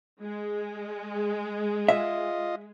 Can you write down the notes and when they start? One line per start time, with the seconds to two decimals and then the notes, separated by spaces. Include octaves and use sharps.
0.22 G#3
1.89 F4 D#5 E5